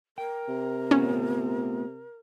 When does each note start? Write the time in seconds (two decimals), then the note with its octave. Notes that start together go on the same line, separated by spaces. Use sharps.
0.18 A#4 G5
0.48 C3
0.91 A3 B3 C#4 F4